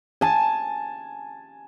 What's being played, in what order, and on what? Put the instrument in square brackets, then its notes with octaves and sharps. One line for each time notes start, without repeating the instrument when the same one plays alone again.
[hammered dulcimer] G#5 A5